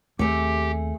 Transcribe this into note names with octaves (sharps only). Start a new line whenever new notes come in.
D#2 A3 C4 G4 G#4